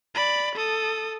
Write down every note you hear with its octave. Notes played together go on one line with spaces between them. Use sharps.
D5 B5
A4 D#6